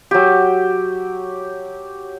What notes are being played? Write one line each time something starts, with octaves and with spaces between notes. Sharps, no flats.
F#3 G4